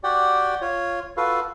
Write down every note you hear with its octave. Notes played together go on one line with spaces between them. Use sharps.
F#4 G4 D5 F#5 G5
F4 C#5
F4 F#4 A4 B4 F5